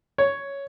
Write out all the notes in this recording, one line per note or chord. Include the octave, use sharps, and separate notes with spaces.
C#5